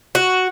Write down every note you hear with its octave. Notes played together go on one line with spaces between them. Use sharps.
F#4